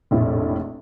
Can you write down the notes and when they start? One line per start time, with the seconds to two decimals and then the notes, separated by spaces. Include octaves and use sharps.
0.11 F1 A#1 A2 E4